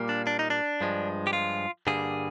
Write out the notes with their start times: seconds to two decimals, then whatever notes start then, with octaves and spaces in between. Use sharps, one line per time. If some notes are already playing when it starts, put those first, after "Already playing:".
Already playing: A#2 G3 A#3
0.09 D4
0.27 D4
0.39 D#4
0.50 D4
0.81 G2 F3 G#3
1.27 G4
1.33 F4
1.87 G2 D3 G3 A#3 G#4